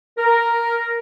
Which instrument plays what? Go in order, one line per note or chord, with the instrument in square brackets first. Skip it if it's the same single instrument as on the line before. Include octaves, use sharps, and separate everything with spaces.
[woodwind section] A#4